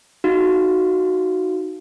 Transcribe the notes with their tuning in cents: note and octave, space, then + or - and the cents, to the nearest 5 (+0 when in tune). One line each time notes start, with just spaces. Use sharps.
D#4 +0 F#4 +0 F5 -10